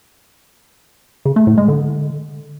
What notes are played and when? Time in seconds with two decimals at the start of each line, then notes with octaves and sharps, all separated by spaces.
1.25 C#3
1.36 A3
1.47 A2
1.58 G#3
1.68 D3